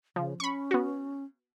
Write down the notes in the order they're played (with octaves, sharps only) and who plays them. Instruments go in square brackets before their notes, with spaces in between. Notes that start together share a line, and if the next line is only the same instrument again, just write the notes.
[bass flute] C#3 [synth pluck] F3
[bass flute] C#4 [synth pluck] B5 C#6
[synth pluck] B3 F#4